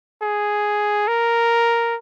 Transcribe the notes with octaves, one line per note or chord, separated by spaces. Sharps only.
G#4
A#4